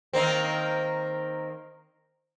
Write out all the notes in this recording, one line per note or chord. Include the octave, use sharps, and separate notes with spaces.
D#3 A#3 C4